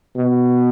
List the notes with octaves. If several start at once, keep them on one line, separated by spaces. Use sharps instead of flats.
B2